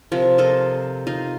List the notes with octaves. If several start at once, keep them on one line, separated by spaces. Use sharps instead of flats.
C3 F3 A#4
F4 A4 A#4 D#5
D#4 F4 D#5 F5